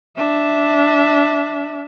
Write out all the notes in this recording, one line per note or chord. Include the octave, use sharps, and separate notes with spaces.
D4 E5